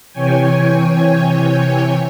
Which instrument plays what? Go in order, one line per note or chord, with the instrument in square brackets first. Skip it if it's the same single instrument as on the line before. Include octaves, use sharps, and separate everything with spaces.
[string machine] C3 E3 C#5 G5 G#5